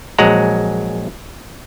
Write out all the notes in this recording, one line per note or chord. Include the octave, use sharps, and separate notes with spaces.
A#1 F#3 G#3 F#5 A#5